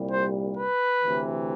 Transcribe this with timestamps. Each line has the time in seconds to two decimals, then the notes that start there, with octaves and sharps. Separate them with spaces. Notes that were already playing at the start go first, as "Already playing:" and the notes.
Already playing: C2 A#2 G3
0.12 C5
0.57 B4
1.03 D2 C3 E3